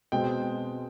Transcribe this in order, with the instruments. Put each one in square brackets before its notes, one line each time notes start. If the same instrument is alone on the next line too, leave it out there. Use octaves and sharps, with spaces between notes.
[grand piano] B2 G#3 C4 G5